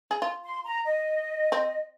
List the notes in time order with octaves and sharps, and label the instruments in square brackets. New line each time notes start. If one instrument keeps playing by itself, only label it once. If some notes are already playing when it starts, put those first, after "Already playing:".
[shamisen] G#4
F4
[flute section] C6
A#5
D#5
[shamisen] C4